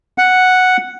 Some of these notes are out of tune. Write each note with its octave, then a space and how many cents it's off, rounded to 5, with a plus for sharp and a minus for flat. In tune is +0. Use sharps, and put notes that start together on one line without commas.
F#5 +0